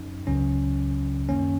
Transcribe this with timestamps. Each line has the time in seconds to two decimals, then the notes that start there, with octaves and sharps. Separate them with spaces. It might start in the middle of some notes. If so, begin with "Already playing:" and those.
Already playing: F#2 F#3 C#4 D#4
0.27 C#2 C#3 F#3 C#4
1.29 F#2 D#3 A#3 C#4